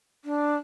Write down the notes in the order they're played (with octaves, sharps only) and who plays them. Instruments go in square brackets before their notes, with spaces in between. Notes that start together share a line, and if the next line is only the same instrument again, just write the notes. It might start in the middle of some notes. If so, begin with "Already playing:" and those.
[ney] D4